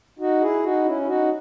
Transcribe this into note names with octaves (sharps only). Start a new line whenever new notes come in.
D#4 F#4
E4 G#4
D#4 F#4
C#4 E4
E4
D#4 F#4